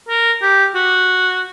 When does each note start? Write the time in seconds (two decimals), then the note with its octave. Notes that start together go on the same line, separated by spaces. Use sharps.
0.09 A#4
0.42 G4
0.75 F#4